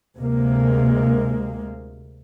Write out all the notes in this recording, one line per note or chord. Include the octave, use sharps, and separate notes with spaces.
D2 C3 G#3 A#3